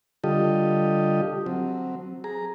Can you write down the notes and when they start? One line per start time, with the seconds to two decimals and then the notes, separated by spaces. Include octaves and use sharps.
0.24 D3 G3 F4 G4 A4 D#5
1.46 F#3 C4
2.24 G#4 A#5